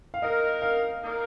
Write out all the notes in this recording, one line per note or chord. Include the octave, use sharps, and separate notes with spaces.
F5
A#3 D#4 A#4 D#5
F5
A#3 D#4 A#4 D5